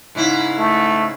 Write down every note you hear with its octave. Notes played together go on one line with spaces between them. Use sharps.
G#2 C#3 E4
A3